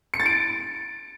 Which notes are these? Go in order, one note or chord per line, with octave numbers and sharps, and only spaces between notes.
C#7
A6
D7